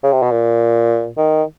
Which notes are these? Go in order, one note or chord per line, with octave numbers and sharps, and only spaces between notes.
C#3
C3
B2
A#2
D#3